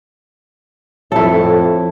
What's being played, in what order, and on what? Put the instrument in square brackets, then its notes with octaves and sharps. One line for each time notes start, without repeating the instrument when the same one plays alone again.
[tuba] F2 [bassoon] A2 [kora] E4 A4